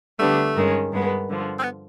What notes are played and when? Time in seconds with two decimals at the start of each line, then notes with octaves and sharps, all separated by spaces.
0.19 D3 G3 A3 B3 D4
0.55 G2 D#3 G#3 C#4
0.92 G2 D#3 G#3 B3
1.28 G2 D3 F3
1.59 C4
1.63 B3